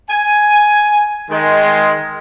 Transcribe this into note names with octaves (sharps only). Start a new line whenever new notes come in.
G#5
D#3 G#3